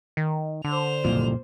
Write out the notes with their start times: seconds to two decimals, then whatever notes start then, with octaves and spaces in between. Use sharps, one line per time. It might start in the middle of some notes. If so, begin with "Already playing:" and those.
0.17 D#3
0.64 D3 C5 F7
1.05 F#1 C2 F2 A#2